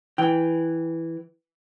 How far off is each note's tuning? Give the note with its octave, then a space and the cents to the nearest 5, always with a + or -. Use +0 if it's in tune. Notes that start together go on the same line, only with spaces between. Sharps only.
E3 +0 G5 +0